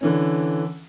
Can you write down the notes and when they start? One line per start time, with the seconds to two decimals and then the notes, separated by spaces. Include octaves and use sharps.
0.01 D3 E3 C#4